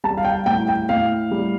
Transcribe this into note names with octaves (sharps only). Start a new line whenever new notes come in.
G3 A5
F5
G5
A2 G5
G5
A2 F5
G3